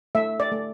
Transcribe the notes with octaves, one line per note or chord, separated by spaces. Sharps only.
A3 E5
D5
A3